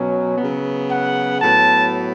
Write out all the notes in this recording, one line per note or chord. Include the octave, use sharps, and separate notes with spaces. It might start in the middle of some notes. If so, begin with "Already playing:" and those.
Already playing: B2 F#3 C#4
C#3 F#3 B3
F#5
A2 F#3 B3 A5